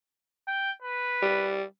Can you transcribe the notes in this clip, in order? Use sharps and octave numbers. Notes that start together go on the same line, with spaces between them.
G5
B4
G3